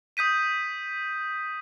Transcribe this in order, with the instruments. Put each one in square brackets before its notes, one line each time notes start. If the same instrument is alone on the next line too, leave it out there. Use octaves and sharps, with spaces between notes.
[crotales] D#6 G6 B6 D#7